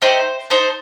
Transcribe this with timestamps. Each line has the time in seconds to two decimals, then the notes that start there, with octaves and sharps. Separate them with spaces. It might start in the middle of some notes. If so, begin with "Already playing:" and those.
0.02 A3 D#4 G4 C5
0.50 D#4 A4 C5